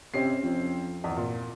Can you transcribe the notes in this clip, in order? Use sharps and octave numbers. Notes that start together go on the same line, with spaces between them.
C3 C4 C#4 C7
F2
E2
A#2